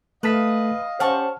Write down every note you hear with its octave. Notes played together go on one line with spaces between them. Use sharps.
A3 B4 D#5 F5 A5 B6
C#4 G4 C5 F#5 A5 C#6 F6